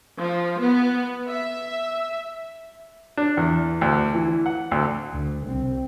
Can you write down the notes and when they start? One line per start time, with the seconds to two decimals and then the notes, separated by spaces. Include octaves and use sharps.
0.18 F3
0.60 B3
1.27 E5
3.17 D4
3.37 E2
3.81 D2
4.15 E3
4.46 F#5
4.71 D2
5.13 D2
5.47 C2 C4